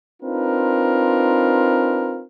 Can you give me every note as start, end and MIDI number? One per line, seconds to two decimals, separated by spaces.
0.23 2.24 60
0.23 2.24 62
0.23 2.24 63
0.23 2.24 65
0.23 2.24 70
0.23 2.24 71